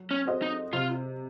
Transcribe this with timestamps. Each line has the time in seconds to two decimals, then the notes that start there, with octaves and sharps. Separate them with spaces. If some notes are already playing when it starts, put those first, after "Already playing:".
Already playing: F#3
0.11 C#4
0.25 C4 F#4 C5 D#5
0.42 D#4
0.73 C3 F4